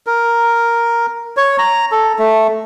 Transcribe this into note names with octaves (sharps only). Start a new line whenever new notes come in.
A#4
C#5
A#5
A4
A3